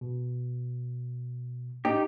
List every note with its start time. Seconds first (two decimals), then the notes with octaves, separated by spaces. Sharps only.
0.01 B2
1.85 D#4 G4